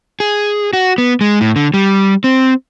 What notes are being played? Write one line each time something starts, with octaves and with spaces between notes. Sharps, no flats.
G#4
F#4
B3
G#3
A2
D3
G3
C4